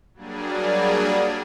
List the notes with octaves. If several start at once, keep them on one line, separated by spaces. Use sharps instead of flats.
F#3 G3 A#3 D4 G#4